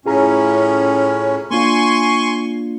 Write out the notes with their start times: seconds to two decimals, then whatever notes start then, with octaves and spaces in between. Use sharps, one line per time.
0.06 A2 C#4 F4 G#4 A#5
1.51 A#3 D4 F4 G#5 C6 C#6